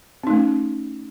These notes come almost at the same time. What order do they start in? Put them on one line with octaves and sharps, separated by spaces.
C4 D#4 A3 C#4